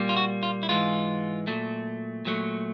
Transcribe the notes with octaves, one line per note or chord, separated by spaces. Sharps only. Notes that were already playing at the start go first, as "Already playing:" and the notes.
Already playing: A#2 G3 A#3
F4
F#4
F4
E4
G#2 E3 G#3 F4
A#2 F#3 A3
A#2 F#3 A3